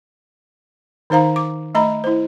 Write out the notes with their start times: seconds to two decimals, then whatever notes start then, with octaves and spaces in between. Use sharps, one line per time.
1.10 D#3 D#4 C5 F5 A#5
1.36 D6
1.75 A3 D#5 A#5 B5
2.04 E4 C5